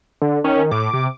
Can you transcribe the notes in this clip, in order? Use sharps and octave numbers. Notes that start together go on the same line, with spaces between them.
D3
D#3 C#4
A2 D6
C3